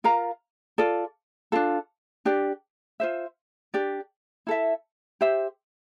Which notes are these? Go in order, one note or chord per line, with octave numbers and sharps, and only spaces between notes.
F4 A#4 F5 A#5
F4 A4 D5
D4 F4 A4
D4 G4 D5
F4 C5 E5
D4 G4 D5
E4 A4 E5
G4 C5 E5